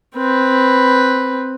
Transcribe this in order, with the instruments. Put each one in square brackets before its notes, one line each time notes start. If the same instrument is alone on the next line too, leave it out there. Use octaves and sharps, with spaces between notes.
[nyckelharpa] C4 B4